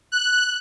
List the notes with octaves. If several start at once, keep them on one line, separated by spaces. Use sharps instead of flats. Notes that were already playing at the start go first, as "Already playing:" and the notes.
F#6